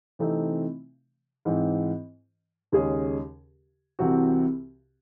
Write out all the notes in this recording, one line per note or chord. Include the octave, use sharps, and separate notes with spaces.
C3 E3 A3 C4 D#4
G#2 E3 C4
D#2 C#3 G#3 C#4 G#4
C2 C3 E3 C4 F#4